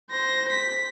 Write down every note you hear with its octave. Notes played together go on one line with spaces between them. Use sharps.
C5 A#6
B6